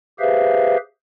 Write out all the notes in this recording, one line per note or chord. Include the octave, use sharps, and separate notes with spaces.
G4 G#4 B4 C5 E5 F5